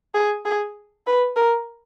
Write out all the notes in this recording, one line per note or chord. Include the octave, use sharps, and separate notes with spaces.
G#4
G#4
B4
A#4